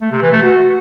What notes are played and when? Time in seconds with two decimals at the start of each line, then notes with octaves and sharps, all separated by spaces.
0.01 A3
0.12 C3
0.22 E3
0.32 A3
0.42 F#4